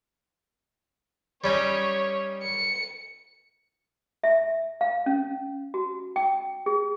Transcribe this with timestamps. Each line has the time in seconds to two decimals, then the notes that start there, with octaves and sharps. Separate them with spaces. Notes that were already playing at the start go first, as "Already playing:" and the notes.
1.44 G3 C#4 D#4 C#5
2.42 C#7
4.24 E5
4.81 F5
5.06 C#4
5.74 F#4
6.16 G5
6.66 G#4